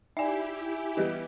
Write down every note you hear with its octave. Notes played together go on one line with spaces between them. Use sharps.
D#4 E4 G4 D5 E5 G#5
E3 G3 B3 D#5